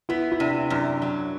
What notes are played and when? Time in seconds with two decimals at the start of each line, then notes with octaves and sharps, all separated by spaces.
0.09 B3 E4
0.32 E4
0.40 C3 D4
0.70 F#2 D4
1.02 F#3